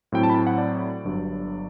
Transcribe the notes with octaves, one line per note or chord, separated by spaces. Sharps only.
A2 F#3 C4 E4 G5
A5
B5
A5
F#5
D5
G1 G2 F#3